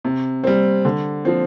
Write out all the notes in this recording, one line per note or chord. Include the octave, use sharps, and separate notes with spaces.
C3
G3 C4
D3
F3 C4